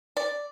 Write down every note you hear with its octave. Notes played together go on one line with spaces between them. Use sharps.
D5